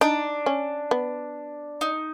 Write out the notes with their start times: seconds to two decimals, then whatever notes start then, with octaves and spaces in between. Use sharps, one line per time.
0.01 D4 D#4
0.46 C#4
0.91 B3
1.81 D#4